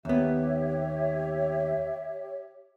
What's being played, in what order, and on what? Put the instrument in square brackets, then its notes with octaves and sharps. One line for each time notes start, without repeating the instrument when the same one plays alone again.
[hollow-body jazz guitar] D#2 B3 [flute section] G4 C#5 E5